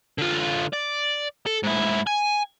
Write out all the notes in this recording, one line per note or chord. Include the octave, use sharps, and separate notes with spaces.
D3 F4
D5
A4
G#2 E4
G#5